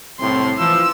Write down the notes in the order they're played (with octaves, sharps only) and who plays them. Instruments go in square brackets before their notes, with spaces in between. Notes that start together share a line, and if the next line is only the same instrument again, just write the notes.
[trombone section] C2 A2 C4 [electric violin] C6
[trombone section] E3 F3 [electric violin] E6